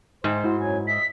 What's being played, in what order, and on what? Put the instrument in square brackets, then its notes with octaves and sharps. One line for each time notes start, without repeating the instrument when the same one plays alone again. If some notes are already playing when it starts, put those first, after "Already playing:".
[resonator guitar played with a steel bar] G#2 [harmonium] C5 [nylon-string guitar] G5
[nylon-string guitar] E4 F#4
[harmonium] F#2 F#3 G#5
[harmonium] D#5 E5 [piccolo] B6